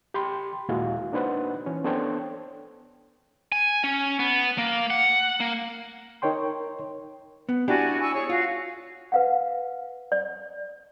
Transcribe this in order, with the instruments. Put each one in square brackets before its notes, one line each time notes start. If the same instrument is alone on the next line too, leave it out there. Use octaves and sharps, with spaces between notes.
[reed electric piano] G4 G5 B5 C6
D#2 A#2 G#3 E4 F#4 F5
A#3 D4 D#4 B4 C5 F#5
E3 C#4
B3 D4 A4 C5 C#5 G5
[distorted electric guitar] G#5
C#4
B3
A#3
F#5
A#3
[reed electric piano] D#4 A#4 C#5 G5 C6
[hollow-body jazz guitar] B3
[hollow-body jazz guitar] D4 E4 G4 [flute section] F#4 D5 G#5
[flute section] G#5 C#6 E6
G#4 C#5 C#6
[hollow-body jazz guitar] F4 [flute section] F#4 F5
[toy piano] B4 F5 F#5
D5